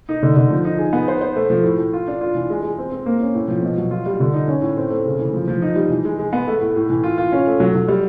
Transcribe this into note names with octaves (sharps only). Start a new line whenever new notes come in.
D#4
D3
D3
F3
D#4
G#4
B3
C5
C5
A3
F3
A2
A2
F4
D4
F4
E3
G#3
G#3
C4
C4
A#3
C#4
A2
F3
B2
F#3
F4
G3
D3
D#4
C#4
A2
C4
A3
C#3
E3
F3
F3
D#4
G3
E3
G#3
G#3
B3
A3
A2
A2
E3
F4
F4
C#4
A3
F#3
F#3
G3